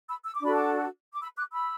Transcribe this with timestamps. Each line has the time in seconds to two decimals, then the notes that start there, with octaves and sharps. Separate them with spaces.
0.09 B5 E6
0.25 E6
0.34 D6
0.41 D4 F#4 A4 B5
0.54 A5 D6
1.13 D6
1.21 B5 E6
1.37 D6 F#6
1.53 B5 E6